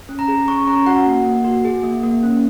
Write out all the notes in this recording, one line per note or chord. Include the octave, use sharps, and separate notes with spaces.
C#4
A#5
G#4
C#4 C#6
C#4 A#5
F#4 F#5
A#3
A#3
F#4
G#4
A#3
A#3
C#4